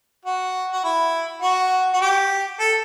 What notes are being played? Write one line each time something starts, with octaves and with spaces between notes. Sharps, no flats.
F#4
F#4
E4
F#4
F#4
G4
A4